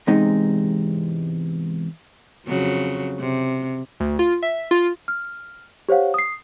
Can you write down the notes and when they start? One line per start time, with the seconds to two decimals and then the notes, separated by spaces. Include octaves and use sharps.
0.07 E2 G#2 C3 G#3 D#4
2.47 F2 C#3 F#3
3.19 C3
4.00 D2
4.19 F4
4.43 E5
4.71 F4
5.08 F6
5.89 G4 C5 C#5 F5 F#5
6.14 D#6 C7